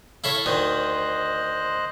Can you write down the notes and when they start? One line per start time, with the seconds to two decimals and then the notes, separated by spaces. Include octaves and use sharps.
0.24 E4 A4 C#5 E5 F5
0.46 D2 D#3 C5 D#5 F#6